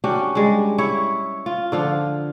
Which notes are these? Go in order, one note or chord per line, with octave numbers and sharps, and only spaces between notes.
C#4 D4 F#4 G4
G3 G#3
E4 C#5 E5
F4
D3 F3 F4